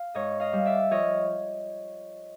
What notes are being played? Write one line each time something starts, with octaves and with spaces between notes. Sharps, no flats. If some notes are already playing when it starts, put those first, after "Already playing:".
Already playing: F5
G#2 C#5 D#5
D#5 F5
G3
D5 E5
F3 C#5 D#5